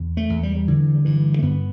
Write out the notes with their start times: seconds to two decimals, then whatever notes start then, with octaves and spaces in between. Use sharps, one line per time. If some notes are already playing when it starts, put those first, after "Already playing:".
Already playing: E2
0.17 A3
0.30 E2
0.43 G3
0.56 G3
0.68 D3 E3
0.95 G3
1.05 G2 E3
1.39 A3
1.42 G2 B3